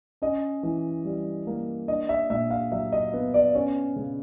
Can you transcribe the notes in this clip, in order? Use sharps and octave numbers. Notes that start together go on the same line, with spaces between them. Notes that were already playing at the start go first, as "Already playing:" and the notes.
C#4 D#5
E3
G3
A#3
D4 D#5
E5
A#2 E5
F5
F#3 E5
D#5
B3
D5
C#4 C#5
C#3